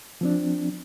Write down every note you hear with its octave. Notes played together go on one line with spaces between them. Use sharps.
F3 C4 D4